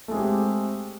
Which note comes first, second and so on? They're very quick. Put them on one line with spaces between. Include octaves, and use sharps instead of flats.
A3 G#3 C4 G4